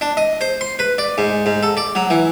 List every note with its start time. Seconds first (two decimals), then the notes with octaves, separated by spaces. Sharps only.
0.01 D4
0.17 D#5
0.41 C5
0.61 C6
0.79 B4
0.98 D5
1.18 G#2
1.46 G#2
1.63 A4
1.77 D5
1.95 F#3
2.10 E3